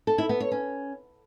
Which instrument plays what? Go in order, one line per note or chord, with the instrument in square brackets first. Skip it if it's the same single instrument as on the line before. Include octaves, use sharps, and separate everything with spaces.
[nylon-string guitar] A4
E4
B3
C#5
C#4